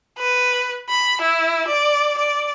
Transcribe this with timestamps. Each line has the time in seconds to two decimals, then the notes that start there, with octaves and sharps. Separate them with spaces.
0.19 B4
0.89 B5
1.22 E4
1.68 D5
2.18 D5